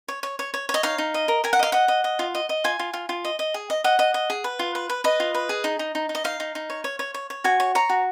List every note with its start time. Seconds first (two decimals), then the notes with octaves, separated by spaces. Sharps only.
0.08 C#5
0.23 C#5
0.39 C#5
0.54 C#5
0.69 C#5
0.74 D#5
0.83 D#4 F5
0.98 D#4
1.14 D#5
1.28 A#4
1.44 A#4 G#5
1.53 F#5
1.59 D#5 F5
1.72 D#5 F#5
1.88 D#5
2.04 D#5
2.19 F4
2.35 D#5
2.49 D#5
2.64 F4 G#5
2.79 F4
2.93 F4
3.09 F4
3.25 D#5
3.39 D#5
3.54 G#4
3.70 D#5
3.84 D#5 F#5
3.99 D#5
4.14 D#5
4.30 G#4
4.44 B4
4.59 F4
4.75 B4
4.89 B4
5.04 B4 D#5
5.20 F4
5.35 B4
5.49 G#4
5.64 D#4
5.79 D#4
5.95 D#4
6.09 D#4
6.15 D#5
6.24 D#4 F5
6.40 D#4
6.55 D#4
6.70 C#5
6.84 C#5
6.99 C#5
7.14 C#5
7.30 C#5
7.44 F#4 G#5
7.60 C#5
7.75 C#5 A#5
7.89 F#4